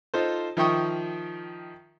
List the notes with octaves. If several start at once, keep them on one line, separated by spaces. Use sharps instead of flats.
D#4 F4 A4 C5
D#3 F3 E5 G5 C#6 D#6